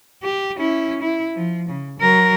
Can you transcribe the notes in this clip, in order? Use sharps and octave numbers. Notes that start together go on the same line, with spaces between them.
G4
C#4 E4
E4
F3
C#3
F#3 A#4